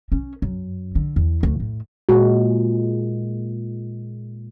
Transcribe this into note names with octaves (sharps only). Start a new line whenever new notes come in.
C#4
F#2
D3
E2
D2
A2
A#2 G#3 F#4